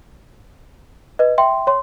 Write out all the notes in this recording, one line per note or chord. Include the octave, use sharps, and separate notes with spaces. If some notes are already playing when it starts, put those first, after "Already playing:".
B4 D#5
E5 G5 C6
C#5 C6